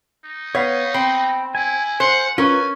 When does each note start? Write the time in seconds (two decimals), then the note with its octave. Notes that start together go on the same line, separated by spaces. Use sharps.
0.24 D#4
0.55 B3 C#5 F5
0.94 C4 G5 B5 C6
1.55 E4 G#5
2.00 C5 F#5
2.38 C#4 F4 A#4 B4 G#5